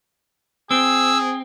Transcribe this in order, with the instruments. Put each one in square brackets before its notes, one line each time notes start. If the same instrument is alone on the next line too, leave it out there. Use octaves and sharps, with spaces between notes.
[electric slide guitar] C4 [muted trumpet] G#4 [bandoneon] E6